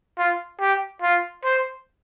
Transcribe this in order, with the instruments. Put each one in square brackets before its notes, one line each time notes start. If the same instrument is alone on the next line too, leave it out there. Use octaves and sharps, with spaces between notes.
[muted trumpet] F4
G4
F4
C5